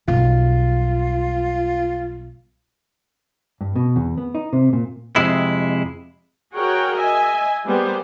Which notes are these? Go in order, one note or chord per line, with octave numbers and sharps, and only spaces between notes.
B1 G3 F4
G2
B2
E2
B3
D#4
C3
A#2
F2 C3 G#3 E4
F#4 G#4 A#4 C#5 F#5 G5
D#5 E5 G#5
G3 A#3 B3 G4 G#4 C5